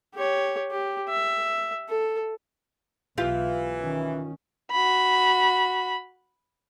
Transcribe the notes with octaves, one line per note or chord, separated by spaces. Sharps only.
G4 C#5
G4
E5
A4
B1 E3 F4 G4
D#3 C#4
F#4 B5